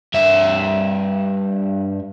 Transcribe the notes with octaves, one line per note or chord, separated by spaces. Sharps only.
G2 E5